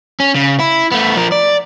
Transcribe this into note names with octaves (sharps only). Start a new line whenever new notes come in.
C#4
C#3
E4
A3 B3
F3 A#4
D5